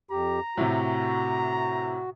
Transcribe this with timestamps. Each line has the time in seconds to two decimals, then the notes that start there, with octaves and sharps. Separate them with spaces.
0.11 F2 G4 A#5
0.57 A2 C3 F#4